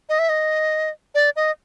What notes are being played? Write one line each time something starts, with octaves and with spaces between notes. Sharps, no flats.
D#5
E5
D#5
D5
D#5